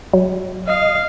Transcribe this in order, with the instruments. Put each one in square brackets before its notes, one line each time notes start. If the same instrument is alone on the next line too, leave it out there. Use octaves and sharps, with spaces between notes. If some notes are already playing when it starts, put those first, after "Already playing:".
[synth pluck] F#3
[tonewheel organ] D#5 [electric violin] F5